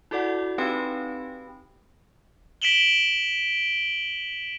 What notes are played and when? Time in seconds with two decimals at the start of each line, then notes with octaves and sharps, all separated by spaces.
0.11 E4 F#4 A4 D5 F#5
0.58 C4 D#4 G4 B4 G5 B5
2.62 B6 D7 E7 F#7 G7